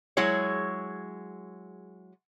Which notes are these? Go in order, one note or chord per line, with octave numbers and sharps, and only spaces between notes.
F#3 G#3 E4 G#4 C#5